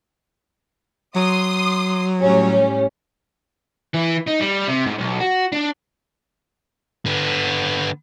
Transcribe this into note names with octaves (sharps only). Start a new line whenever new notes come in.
F#3 C6 D#6
A2 G3 C#4
E3
D#4
G3
C3
G#2
B1
F#4
D4
D3 B3